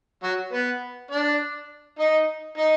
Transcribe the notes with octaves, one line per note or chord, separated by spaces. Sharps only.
F#3 F#4
B3 B4
D4 D5
D#4 D#5
D#4 D#5